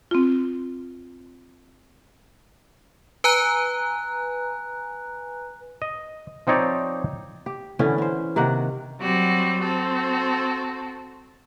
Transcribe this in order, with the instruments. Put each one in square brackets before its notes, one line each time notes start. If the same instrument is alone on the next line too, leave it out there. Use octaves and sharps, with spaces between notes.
[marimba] C4 F4
[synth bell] B4 G#5 A#5 F#6
[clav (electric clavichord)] D#5
F3 C4 D#4 C#5 D5
[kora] G4
D3 E3 B3 C#4
C#4 C5
C3 D#3 A#3 F#5
[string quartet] F#3 G3 C4 F#4
C4 F#4 A4